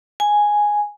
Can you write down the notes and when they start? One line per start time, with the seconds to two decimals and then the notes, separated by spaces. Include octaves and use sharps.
0.20 G#5